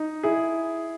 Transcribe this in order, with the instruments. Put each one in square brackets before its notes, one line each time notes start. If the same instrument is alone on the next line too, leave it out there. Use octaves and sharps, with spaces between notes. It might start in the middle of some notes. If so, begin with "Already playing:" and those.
Already playing: [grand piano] D#4
E4 G#4